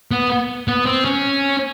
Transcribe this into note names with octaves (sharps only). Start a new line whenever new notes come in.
B3
B3
C4
C#4